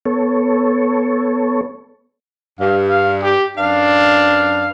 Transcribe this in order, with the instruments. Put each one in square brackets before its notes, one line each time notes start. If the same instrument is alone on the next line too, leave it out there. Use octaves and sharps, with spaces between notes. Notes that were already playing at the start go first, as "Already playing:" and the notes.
[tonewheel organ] B3 A4 C#5
[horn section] G2 [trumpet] F5
[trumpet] F5
G4
[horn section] F#2 B4 F5 [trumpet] D4